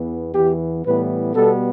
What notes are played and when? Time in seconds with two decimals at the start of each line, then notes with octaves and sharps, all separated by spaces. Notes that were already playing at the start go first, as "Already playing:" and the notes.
Already playing: E2 E3 B3
0.34 E2 E3 B3 G4
0.85 A2 E3 G3 B3 B4
1.34 B2 G3 B3 A4